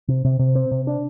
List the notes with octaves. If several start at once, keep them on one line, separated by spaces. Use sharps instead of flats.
C3
C3
C3
C4
C3
D4